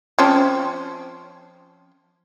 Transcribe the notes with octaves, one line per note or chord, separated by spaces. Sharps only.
F3 C4 C#4